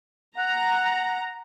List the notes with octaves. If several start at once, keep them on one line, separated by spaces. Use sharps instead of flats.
F#5 A#5 F#6